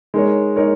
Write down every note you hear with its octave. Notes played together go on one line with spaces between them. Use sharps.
G#3 D#4 A#4 C#5
G#3 D#4 A#4 C#5